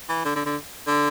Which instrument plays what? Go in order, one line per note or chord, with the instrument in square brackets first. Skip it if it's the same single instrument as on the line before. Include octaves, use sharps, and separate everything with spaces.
[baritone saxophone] E3
D3
D3
D3
D3